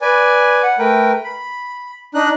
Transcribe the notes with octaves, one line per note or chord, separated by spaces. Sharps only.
B4 D5 G#5
F#5
A3 A#4 B4 G5
B5
D4 D#4 F#6